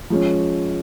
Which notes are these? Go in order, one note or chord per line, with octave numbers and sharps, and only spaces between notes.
F3 G#3 C#4